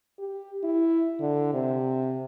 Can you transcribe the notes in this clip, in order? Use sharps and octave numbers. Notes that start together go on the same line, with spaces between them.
G4
E4
D3
C3